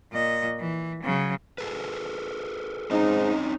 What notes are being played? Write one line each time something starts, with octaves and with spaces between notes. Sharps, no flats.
A#2 D#5
E3
C#3 F#3
G#4 A4 B4
G#2 C4 C#4 D#4 D#5